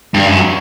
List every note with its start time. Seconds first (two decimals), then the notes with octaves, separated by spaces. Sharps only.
0.14 G2
0.26 F#2